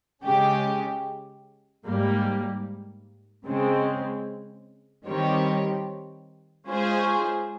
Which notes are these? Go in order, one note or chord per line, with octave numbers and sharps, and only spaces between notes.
C#3 G#3 C#4 G4
G#2 G3 A#3
C#3 G#3 C4
D#3 G3 C4 G4 C#5
G#3 C#4 F4 G#4 C5